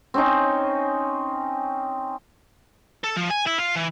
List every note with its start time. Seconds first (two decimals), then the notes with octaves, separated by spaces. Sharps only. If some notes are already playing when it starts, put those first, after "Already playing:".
0.14 C4 C#4 D#4
3.04 A4
3.16 F3
3.30 G#5
3.46 E4
3.58 F4
3.75 E3